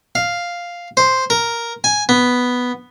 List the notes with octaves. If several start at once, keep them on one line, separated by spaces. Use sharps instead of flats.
F5
C5
A#4
G#5
B3